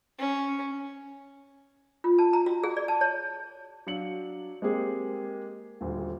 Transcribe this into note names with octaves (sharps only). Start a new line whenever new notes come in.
C#4
F4
A5
A#5
F#4
G#4
D5
A5
C#5
F#3 D4 F5 C#7 F#7
G#3 A#3 C4 G4 G#4
D#1 D2